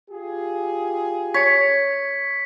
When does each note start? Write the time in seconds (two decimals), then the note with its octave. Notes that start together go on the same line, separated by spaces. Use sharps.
0.11 F4 G4 G#4
1.34 C#5 B6 C#7